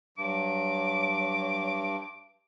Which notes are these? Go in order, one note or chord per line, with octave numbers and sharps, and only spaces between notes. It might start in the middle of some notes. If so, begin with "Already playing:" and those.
G2 F#3 D6